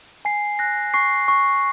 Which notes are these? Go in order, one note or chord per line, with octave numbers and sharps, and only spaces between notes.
G#5 C7
F#6 A#6
C#6 C7
C#6